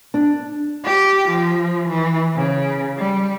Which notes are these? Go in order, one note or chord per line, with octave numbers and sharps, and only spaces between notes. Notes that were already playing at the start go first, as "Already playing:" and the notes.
D4
G4
F3
E3
C#3
G3